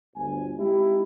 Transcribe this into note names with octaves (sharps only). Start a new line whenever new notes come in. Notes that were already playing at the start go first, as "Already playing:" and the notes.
G1 D2 G#5
G#3 C4 D#4 E4 G4